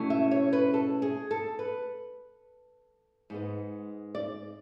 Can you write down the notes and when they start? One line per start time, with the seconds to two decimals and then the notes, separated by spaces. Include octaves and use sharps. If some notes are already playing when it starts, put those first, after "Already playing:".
Already playing: B2 A3 C#4 E4
0.10 E5
0.31 C#5
0.53 B4
0.74 A4
1.02 G#4
1.31 A4
1.59 B4
3.30 G#2 G#3 B3
4.15 D5